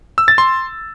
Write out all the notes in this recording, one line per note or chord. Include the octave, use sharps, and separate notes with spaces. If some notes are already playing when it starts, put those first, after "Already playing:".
E6
A6
C6